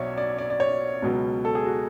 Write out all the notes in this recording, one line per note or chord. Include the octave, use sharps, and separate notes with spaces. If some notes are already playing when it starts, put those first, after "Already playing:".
Already playing: B1 B2 F#3 C#5 D5 E5
D5
D5
D5
C#5
C#2 B2 F#3
A4
G#4
F#4